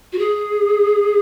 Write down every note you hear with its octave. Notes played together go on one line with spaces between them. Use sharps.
F#4
G#4